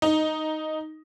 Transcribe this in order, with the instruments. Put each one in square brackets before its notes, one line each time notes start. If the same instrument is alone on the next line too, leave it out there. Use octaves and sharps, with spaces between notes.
[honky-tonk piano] D#4